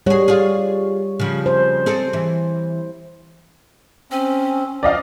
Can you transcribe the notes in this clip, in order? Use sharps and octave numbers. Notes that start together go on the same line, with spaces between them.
G3 F#4 G#4 C#5
F4 G#4
C#3 F3
C5
C4 G#4 A4
E3
C4 C#4
F3 D5 D#5 F5